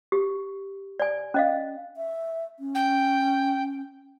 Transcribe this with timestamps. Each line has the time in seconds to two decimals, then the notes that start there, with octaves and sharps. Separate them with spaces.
0.12 G4
1.00 D5 G#5
1.34 C#4 D#5 F5
1.97 E5
2.59 C#4
2.74 G5